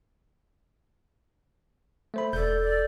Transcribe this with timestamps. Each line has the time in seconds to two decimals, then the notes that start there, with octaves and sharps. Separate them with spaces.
2.14 A3 C5 B5
2.33 E1 A4 D5 G6
2.60 D5